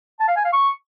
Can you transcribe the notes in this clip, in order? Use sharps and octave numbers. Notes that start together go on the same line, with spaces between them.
A5
F5
G#5
F5
C#6